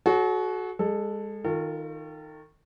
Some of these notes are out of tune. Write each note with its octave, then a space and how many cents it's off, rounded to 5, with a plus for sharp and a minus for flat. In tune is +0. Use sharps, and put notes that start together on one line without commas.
F#4 +0 A4 -45 C#5 +5
G#3 -30 A4 +0
D#3 +10 F4 +0 A4 +45